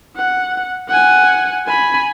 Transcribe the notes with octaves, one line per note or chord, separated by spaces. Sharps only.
F#5
F#5 G#5
G#5 B5